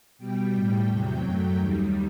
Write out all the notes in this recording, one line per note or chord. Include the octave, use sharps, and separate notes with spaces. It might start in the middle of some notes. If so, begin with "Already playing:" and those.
B2 G3 G5
A2 G3
E2 C3 F#3 G5
F#2 F#3 A3
D#2 D#3 G3